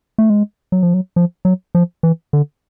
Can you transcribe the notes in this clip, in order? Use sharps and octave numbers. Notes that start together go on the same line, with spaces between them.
A3
G#3
F#3
F3
F#3
F3
F#3
F3
E3
D3